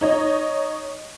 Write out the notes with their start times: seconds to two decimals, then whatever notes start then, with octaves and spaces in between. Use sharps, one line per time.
0.01 D#4 C#5 D#5